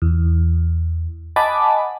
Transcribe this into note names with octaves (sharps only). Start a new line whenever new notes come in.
E2
D#5 F#5 G#5 A5 B5 D6